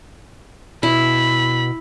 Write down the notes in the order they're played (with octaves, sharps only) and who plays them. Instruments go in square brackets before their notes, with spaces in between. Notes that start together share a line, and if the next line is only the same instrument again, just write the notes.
[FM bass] B2 [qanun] E4 [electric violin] B5